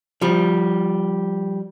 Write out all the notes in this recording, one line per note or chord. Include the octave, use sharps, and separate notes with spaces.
F3 G3